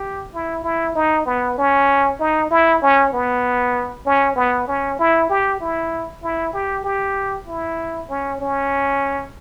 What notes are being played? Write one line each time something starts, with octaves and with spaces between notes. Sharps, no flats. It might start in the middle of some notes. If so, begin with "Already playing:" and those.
Already playing: G4
E4
E4
D#4
B3
C#4
D#4
E4
C#4
B3
C#4
B3
C#4
E4
G4
E4
E4
G4
G4
E4
C#4
C#4